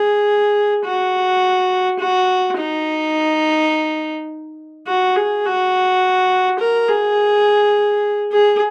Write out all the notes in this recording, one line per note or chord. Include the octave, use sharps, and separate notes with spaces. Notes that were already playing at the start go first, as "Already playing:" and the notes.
Already playing: G#4
F#4
F#4
D#4
F#4
G#4
F#4
A#4
G#4
G#4